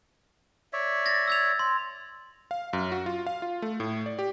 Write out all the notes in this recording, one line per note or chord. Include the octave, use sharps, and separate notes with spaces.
C#5 D5 E5
A6 A#6
E6 G#6 F7
C6
F5
F#2
F#4
F4
F5
F4
A3
A2
D5
G4